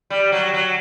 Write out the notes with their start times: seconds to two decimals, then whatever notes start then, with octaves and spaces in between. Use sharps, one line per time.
0.10 G3
0.32 F#3
0.54 F#3